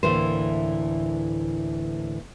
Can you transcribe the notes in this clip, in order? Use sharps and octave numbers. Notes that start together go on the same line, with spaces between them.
D2 A2 E3 A#3 C5